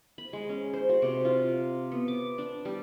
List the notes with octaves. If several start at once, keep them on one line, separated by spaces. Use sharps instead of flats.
B5
G#3
C#4
C5
F#4
C3
F4
B3
D6
D4
G3